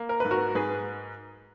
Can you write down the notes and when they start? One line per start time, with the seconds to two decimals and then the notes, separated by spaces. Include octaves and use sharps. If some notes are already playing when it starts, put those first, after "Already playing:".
Already playing: A#3
0.09 A#4
0.20 G#2 B4
0.31 F#4 A#4
0.55 G#2 G#4 B4